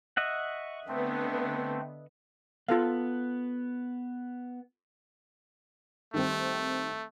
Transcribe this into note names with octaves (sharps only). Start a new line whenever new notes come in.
D#5 E5 F#5 C#6
D3 A3 B3 C4
B3 F4 A4 F5
D#3 G3 A3 C4